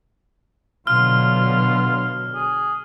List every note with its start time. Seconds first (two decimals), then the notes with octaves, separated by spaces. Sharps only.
0.87 B2 D3 F#3 F4 F6
2.34 G#4